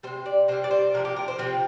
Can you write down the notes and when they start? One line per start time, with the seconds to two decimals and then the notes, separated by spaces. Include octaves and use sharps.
0.03 C3 G3 C5
0.26 D5
0.48 C3 G3 C5
0.64 D5
0.71 C5
0.94 C3 F3 A#4
1.05 G4
1.16 A#4
1.28 C5
1.38 C3 F3 C4